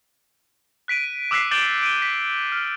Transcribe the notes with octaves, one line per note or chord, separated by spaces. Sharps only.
F#6 B6 D7 D#7
D6 E6 F#6 B6 C7
D6 G6 A6 D7 F#7 G7
D7 D#7 G7
B6
F6